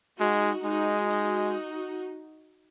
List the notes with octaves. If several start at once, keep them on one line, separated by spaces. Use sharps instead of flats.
G#3 D#4 F#4
G#3 D#4 F#4
D#4 F#4